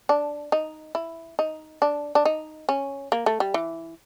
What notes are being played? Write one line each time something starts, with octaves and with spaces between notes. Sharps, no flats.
D4
D#4
E4
D#4
D4
D4
D#4
C#4
A#3
A3
G3
E3